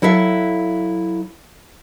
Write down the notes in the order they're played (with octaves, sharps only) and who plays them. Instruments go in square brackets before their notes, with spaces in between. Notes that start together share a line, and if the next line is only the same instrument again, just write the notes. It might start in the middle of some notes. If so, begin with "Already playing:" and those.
[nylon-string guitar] F#3 E4 A4 E5 F5